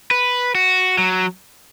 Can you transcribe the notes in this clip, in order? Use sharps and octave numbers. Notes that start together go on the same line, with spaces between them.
B4
F#4
F#3